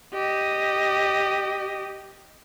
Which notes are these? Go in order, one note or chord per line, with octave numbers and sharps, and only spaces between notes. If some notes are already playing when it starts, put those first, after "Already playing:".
G4 D#5